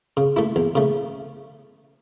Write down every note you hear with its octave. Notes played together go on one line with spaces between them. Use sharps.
C#3
A3 E4
E2
C#3 A3